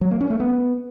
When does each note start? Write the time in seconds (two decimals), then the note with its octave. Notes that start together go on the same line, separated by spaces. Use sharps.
0.01 F#3
0.11 A#3
0.21 C#4
0.30 A3
0.40 B3